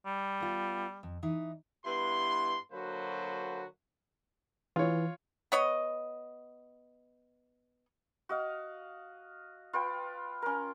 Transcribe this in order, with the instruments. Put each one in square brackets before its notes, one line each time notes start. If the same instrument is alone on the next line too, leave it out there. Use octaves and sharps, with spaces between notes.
[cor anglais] G3
[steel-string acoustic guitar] B3 F4
F2
E3 D#4 E5
[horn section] G2 B3 E4 C6
D3 F#3 A#3 F#4 B4 C5
[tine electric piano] E3 [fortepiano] F4 C#5
[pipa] B3 C#5 D#5
[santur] F#4 D#5 F5
F4 B4 G5
C#4 A#4